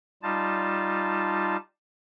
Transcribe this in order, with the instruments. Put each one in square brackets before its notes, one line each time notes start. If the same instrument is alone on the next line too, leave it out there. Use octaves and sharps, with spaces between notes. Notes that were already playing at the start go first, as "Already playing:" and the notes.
[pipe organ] G3 D#4 F4 A5